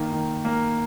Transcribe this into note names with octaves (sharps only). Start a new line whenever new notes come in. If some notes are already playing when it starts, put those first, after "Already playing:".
Already playing: D#3 A#3
D#3
A#3